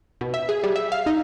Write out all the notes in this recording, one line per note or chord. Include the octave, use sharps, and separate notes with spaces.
B2
E5
G#4
G3
E5
F5
D#4